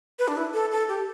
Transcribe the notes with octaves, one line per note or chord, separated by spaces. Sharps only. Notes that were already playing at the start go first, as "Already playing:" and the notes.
B4
D4
E4
A4
A4
G4